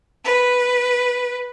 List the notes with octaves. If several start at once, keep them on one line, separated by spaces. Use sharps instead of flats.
B4